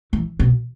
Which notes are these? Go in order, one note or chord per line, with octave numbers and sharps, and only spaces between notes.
E3
B2